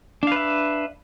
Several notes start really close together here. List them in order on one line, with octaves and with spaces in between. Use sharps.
D4 F5 B4 E5